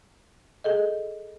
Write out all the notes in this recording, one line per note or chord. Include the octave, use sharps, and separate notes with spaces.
G#4 A4 D#5